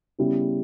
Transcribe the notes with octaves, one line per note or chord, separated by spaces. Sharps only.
C#3 G3 B3 E4